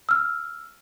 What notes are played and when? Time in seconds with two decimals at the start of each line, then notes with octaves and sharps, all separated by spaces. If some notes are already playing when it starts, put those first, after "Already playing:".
0.09 E6 F6